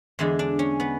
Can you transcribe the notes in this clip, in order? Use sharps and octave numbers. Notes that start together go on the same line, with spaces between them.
E2 D3 G#3
D4
C#4
B3